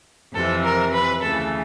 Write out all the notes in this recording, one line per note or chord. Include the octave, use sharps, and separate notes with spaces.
F2 C3 E3 A4
A#4
B4
D2 C#3 E3 A4